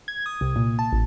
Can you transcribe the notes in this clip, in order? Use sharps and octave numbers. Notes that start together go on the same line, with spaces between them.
G#6
D#6
C2
A#2
A5
A1